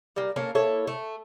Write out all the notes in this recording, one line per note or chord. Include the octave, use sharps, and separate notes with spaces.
G3 A#3
A#3 C#4 A4 A#4
A#3 E4 A4 C#5
A3